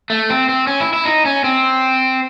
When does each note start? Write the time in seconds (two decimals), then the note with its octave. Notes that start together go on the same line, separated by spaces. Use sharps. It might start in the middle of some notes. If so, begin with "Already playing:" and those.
0.10 A3
0.30 C4
0.49 C4
0.67 C#4
0.80 E4
0.93 E4
1.05 D#4
1.25 C#4
1.44 C4